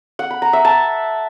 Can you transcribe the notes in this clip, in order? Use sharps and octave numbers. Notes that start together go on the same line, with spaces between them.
F#5
B5
A#5
E5
A5